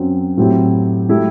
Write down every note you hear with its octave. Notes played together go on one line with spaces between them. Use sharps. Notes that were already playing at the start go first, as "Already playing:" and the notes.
Already playing: F#2 F#3 C4
A2 F#3 C4 E4 G4
F#3 A3 E4 G4